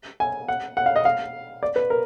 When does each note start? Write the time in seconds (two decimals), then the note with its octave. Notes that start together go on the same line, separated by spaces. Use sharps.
0.20 G#5
0.48 F#5
0.77 F#5
0.86 F5
0.96 D#5
1.05 F5
1.63 D5
1.76 B4
1.90 A#4